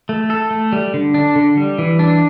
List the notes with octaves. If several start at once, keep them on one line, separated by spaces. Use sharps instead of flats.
A3
A4
A3
G3
D3
D4
D3
G3
E3
D4